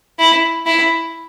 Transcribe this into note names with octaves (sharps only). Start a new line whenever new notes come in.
E4
E4